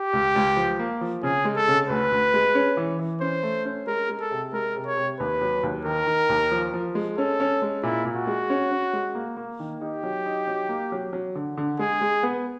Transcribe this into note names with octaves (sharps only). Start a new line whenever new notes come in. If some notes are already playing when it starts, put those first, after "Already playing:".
Already playing: G4
C#2
C#2
F3
A#3
F3
C#3 G#4
G#3
A4
C#3
D2 B4
D2
G#3
C#4
E3
E3
C#4 C5
A3
C#4
G#3 A#4
G#3
A4
C3
G#3 A#4
C3
C#5
C3
D#2 B4
F#3
D#2
D#3 A#4
D#3
D#2
F3
F3
G#3
C#4 A4
C#4
G#3
A#2 E4
A#2
F#4
G#3
C#4
C#4
G#3
A#3
A#3
D#3
D#4 G4
F#3
D#4
F#3
A#3
F#3
F#3
D3
D3
G#3 G#4
G#3
B3